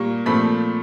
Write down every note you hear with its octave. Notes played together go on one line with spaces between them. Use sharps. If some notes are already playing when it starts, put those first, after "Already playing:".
Already playing: A#2 G3 A#3 C#6
A#2 F3 A3 C4 B5